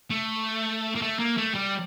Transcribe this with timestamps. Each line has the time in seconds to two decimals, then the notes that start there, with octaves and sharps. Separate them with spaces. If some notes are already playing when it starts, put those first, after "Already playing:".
0.10 A3
0.95 A#3
1.01 A3
1.19 A#3
1.37 A3
1.54 G3